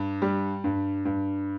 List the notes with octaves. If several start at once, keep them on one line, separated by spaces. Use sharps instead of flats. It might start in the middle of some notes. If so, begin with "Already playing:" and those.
Already playing: G2
G3
G2
G2